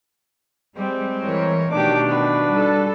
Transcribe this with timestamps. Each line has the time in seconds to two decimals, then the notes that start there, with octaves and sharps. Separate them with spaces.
0.77 G3 G#3 C4
1.22 E3 A#4 C#5
1.72 B2 D#3 A3 D4 G4 D6
2.09 F#4 B4
2.49 G3 A4